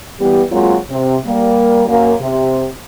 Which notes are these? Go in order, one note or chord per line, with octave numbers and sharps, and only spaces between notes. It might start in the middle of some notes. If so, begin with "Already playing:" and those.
E3 G3 B3 G4
F#3 G#3 A#3 C4 F4
C3
G3 A#3
F#2 A#3
C3